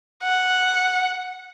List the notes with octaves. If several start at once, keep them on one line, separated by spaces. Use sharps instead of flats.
F#5